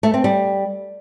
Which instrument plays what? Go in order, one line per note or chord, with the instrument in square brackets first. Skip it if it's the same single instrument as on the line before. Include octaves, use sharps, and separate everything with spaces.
[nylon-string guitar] A3
C4
G3